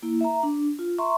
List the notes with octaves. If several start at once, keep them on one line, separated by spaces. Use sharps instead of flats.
A#3 E4
E5 A#5
D4
F4
E5 A#5 C6 C#6